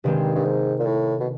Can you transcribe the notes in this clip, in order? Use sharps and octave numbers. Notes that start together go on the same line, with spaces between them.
G2 C3 D#3 G#3 C4
G2
G#2
A#2
A2
B2